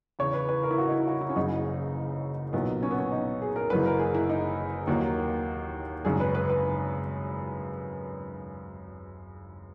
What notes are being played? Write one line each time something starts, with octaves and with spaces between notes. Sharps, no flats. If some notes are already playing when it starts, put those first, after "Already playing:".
E2 C#3 E3 C#5
B4
B4
A#4
E4
F#4
D#4
E4
F#4
E4
C#4
F#1 F#2 C#3 E3 D#4
B1 A#2 F#3 B3
C#4
B3
C#4
D#4
G#4
A#4
F#1 F#2 E3 B4
A#4
G#4
E4
D#4
D#2 D#3 F#3 A#3
G#1 F#2 C#3 G#4
B4
B4
B4